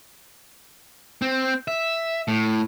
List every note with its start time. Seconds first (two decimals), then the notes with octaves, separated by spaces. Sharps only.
1.22 C4
1.68 E5
2.28 A2